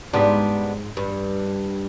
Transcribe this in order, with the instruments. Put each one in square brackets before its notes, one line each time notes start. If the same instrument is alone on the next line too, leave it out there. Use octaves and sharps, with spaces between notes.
[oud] G#2 [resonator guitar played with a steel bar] G3 B3 D4
[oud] G2